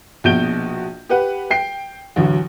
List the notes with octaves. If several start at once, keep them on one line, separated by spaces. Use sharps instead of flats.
A#1 B2 F#4 G6 D7 G7
G4 B4 F#5
G5 C7
A1 D2 F#3